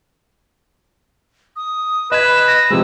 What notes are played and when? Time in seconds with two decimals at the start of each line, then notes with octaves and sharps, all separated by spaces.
1.56 D#6
2.12 B4 D#5 B5 G#6 E7
2.47 A#6
2.70 C3 F3 G#3 E6